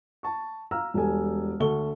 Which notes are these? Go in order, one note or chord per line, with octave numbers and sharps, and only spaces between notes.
A5 C#6
F5 A#5 E6 F6
E1 G3 A4 G#5
D2 D3 A4 C#6 G7